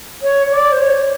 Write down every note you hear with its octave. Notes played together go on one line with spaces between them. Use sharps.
C#5
D5
C5
C#5